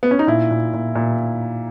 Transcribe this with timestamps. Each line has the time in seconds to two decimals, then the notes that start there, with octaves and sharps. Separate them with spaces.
0.03 B3
0.11 C#4
0.19 D#4
0.27 A#2 E4
0.51 A#2
0.73 A#2
0.95 A#2